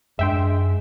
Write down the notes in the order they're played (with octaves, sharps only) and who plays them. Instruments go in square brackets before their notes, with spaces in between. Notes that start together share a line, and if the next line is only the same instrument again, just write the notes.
[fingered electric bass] F#2 D4 [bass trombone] G#3 [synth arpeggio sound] E5 G5 C6